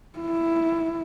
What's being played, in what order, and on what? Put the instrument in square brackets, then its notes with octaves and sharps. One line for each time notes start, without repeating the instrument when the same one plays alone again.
[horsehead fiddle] E4